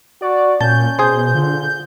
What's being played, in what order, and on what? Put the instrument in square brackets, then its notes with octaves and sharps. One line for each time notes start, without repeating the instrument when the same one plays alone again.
[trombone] F#4 [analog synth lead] D5
[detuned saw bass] A#2 [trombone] C#4 [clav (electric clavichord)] A5 [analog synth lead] G6
[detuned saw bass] B2 [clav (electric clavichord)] G#4 C5
[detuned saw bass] D3 [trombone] F4